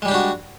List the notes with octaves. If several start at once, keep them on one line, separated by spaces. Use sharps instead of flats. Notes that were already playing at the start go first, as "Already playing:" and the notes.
G3 G#3 D4 F#4 G4